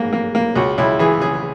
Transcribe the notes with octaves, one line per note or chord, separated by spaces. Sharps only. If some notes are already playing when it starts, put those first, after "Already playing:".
Already playing: G#2 A#3
A#3
A#3
C#2 F#4
C#2 E4
E3 G#4
C#3 G#4